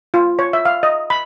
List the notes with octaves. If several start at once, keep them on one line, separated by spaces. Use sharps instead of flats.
F4
C#5
E5
F5
D#5
B5